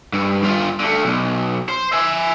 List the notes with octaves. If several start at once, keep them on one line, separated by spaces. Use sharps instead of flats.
G2
G2 F4
D3 A3
B1
C5
E5 G#5